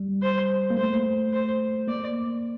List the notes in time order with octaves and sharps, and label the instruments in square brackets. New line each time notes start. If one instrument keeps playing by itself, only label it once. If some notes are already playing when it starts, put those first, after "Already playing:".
Already playing: [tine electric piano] G3
[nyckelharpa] C5
[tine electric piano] A#3
[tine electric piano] A3 [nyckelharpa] C5
[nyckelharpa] C5
[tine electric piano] A#3 [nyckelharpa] D5